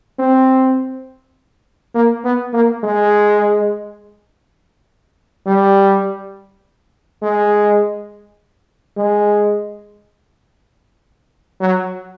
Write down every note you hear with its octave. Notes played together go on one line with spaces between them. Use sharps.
C4
A#3
B3
A#3
G#3
G3
G#3
G#3
F#3